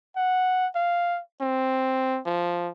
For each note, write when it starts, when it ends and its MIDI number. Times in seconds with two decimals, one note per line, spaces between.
0.16 0.67 78
0.75 1.20 77
1.41 2.19 60
2.25 2.70 53